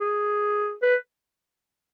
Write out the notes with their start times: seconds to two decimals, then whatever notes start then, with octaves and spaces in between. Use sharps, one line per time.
0.01 G#4
0.82 B4